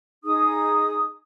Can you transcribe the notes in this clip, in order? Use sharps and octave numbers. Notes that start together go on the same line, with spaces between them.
D#4 G#4 D#6